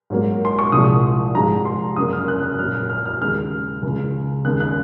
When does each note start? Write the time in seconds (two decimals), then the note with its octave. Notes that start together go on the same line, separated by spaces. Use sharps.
0.10 G#2 F#3 A#3
0.45 C6
0.59 C#6
0.72 C2 A#2 F3 G#3 D#6
1.35 G#2 F3 G#3 A#5
1.65 C6
1.96 F#2 C#3 F#3 A#3 D#6
2.13 F6
2.28 F#6
2.43 F#6
2.58 A#2 F#3 A#3 F6
2.75 F6
2.90 F6
3.05 F6
3.20 D#2 C#3 G#3 F6
3.83 C#2 C#3 G#3
4.45 D#2 C#3 G#3 F#6
4.60 F#6